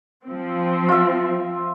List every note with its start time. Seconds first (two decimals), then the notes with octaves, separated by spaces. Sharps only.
0.25 F3 C4
0.89 F4 E5